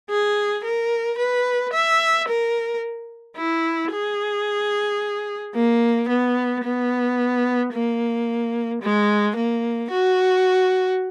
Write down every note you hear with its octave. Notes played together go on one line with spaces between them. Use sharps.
G#4
A#4
B4
E5
A#4
E4
G#4
A#3
B3
B3
A#3
G#3
A#3
F#4